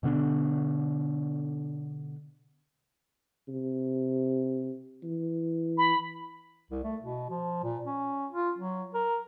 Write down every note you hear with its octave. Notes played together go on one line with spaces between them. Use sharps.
B2 D3 B3 D4
C3
E3
B5
C2
A3
B2
F3
A#2
C#4
F4
F#3
A#4